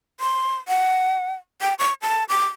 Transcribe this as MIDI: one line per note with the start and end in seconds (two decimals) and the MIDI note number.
0.20 0.55 84
0.68 1.33 78
1.61 1.74 79
1.79 1.94 85
2.02 2.24 81
2.29 2.45 86